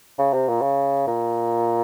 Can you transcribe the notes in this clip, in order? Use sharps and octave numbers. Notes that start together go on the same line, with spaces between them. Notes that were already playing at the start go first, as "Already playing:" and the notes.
C#3
C3
A#2
C#3
A#2